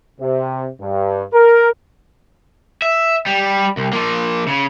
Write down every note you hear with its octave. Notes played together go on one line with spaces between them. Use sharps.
C3
G2
A#4
E5
G3
C2
F3 A#3
C#3